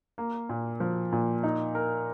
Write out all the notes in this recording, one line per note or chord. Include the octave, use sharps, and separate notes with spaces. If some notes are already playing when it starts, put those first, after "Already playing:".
A#3
A#2
F3
A#2
D#4
A#4